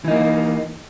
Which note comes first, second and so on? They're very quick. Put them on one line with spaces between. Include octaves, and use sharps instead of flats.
E3 D#4 A#3